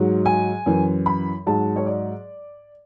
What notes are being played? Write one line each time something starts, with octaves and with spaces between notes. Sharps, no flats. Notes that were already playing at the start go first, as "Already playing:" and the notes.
Already playing: G#2 F#3
G#5
F#2 E3
B5
G#2 F#3 A5
C#5
D5